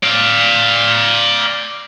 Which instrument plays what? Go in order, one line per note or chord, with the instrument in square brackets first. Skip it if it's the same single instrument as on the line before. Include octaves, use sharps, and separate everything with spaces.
[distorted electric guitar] D5 F5